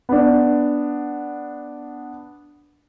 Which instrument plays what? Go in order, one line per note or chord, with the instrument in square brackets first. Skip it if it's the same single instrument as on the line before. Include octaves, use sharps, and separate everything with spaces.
[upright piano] B3 D4